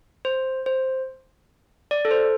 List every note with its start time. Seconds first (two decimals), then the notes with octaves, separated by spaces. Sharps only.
0.25 C5
0.66 C5
1.91 D5
2.05 A4
2.11 C5